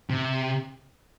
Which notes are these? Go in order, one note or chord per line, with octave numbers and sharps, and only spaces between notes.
C3